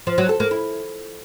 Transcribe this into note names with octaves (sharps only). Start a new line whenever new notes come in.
F3
F#3
A4
A#3
E4